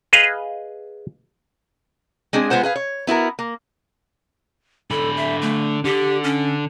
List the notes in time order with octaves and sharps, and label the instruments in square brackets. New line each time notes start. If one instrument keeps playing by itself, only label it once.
[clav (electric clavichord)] G#4 B4 D#5 F5
[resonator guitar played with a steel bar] G#3 C4 D4 G#4
G#3 B3 F4 C5 F#5
G#4 B4 F5
C#5
B3 E4 F#4 A#4
A#3
[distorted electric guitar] D3 B5 [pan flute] A4
[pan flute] E5
A3
[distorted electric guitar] D3 [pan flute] G4
[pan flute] C#4